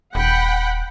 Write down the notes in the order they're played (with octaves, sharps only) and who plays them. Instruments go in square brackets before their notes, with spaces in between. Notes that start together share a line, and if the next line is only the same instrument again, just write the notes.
[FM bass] D#1 [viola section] F#5 G5 B5